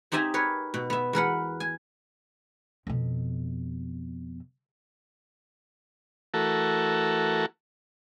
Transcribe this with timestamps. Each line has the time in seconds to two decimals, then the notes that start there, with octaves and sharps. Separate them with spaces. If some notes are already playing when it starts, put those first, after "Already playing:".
0.12 C4 D#4 G4 E5 G#5 A#5
0.34 A#4 B4 C#5
0.74 B2
0.90 B3 E5
1.13 E2 A#4 B4 F#5
1.60 G#5
2.87 F2 B2
6.34 E3 A3 F#4 A4 A#4